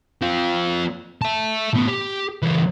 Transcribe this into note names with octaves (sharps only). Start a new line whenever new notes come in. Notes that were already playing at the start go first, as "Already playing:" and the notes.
C4 F4
E5 A5
A2 B3
G4
C#2 E3